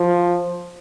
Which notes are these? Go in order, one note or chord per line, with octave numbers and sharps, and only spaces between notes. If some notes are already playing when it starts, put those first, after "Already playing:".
Already playing: F3